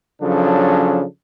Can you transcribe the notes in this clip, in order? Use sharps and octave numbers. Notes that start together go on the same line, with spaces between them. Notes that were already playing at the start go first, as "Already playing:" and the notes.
C#3 F3 F#3 C#4 D4 A4